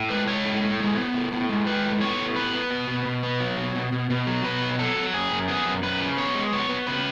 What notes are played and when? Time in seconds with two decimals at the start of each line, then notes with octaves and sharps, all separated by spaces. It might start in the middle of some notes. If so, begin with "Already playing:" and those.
Already playing: A2
0.10 G#3 B4
0.28 G#3 C#5
0.45 A2
0.62 A2
0.80 G#3
0.97 B3
1.14 A2
1.32 A2
1.49 G#3
1.67 G#3 B4
1.84 A2
2.01 B3 C#5
2.19 A2
2.36 B3 B4
2.53 B3
2.70 B2
2.88 B2
3.05 B2
3.23 B3
3.40 F#3
3.57 B2
3.75 B2
3.92 B2
4.10 B2
4.27 F#3
4.44 B2 B4
4.62 F#3
4.79 F#3 A4
4.96 F#3
5.14 F#2 G#4
5.31 F#2
5.48 B3 G#4
5.66 F#2
5.83 F#2 B4
6.00 C#3
6.17 B3 C#5
6.35 G#3
6.53 B3 C#5
6.69 B3
6.87 C#3 B4